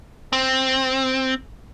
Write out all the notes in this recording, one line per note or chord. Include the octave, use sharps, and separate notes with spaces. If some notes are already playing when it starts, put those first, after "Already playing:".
C4